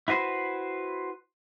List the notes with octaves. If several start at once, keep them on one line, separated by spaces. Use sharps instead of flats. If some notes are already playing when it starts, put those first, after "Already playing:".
E4 F#4 B4 C5